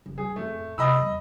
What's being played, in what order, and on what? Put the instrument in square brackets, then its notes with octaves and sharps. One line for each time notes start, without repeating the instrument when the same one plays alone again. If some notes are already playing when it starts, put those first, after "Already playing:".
[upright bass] F#1
[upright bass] G3 [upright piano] G#4
[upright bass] F2 A2 [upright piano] A3
[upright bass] C3 [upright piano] D#5 B5 E6
[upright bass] E2 G3